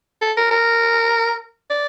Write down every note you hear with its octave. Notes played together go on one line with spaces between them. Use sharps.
A4
A#4
A#4
D5